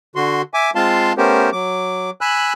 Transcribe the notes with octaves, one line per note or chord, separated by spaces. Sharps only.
D3 F#4 C6
E5 G#5 D6
G#3 C4 F4 F5 A5 C6
A3 B3 C#4 G4 A#4 C5
F#3 D6
G#5 B5 E6 F#6